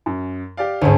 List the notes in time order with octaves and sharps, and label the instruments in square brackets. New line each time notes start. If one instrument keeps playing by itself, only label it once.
[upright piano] F#2
G4 D5 F5
[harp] D2 G#2 [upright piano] C#4 G#4